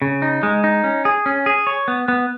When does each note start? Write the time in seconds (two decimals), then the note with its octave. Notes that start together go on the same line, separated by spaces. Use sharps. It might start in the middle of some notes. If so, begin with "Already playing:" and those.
0.02 C#3
0.22 D#4
0.43 G#3
0.64 D#4
0.84 C#4
1.05 G#4
1.26 C#4
1.46 G#4
1.67 C#5
1.88 B3
2.08 B3